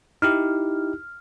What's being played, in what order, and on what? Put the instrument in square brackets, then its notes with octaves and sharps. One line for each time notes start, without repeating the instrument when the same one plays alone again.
[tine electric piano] D#4 E4 G4 [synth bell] F6